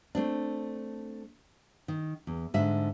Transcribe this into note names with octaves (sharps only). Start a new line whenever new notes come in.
A3 C4 D4
D#3
E2
G#2 D3 E5